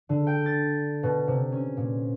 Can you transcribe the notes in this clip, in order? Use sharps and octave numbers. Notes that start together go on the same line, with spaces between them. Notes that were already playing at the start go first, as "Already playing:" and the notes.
D3
G5
A6
B2
C3
C#4
A#2